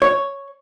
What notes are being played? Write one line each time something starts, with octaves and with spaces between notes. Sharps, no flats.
C#5